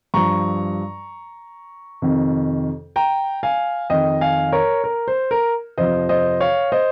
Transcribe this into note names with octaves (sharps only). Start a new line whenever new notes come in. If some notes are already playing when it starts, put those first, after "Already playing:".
G2 F3 A#5 C#6
F2 C3 D#3
G5 A#5
F5 G#5
F2 D#3 D#5 G5
F5 G#5
A#4 C#5
A#4
C5
A#4
F2 C3 F3 C5 D#5
C5 D#5
C#5 F5
C5 D#5